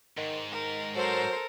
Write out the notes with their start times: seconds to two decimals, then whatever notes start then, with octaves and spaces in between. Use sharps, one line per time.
0.17 G#2 D#3
0.52 D#3 A#4
0.96 F#3 A4 A#4 C5